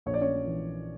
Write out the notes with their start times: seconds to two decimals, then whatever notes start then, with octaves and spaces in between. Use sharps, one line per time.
0.06 A#1 C#5
0.14 D5
0.21 C#4 C#5
0.46 E3